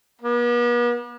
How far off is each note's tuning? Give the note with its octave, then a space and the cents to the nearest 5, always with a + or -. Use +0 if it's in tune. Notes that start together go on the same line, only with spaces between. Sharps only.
B3 -45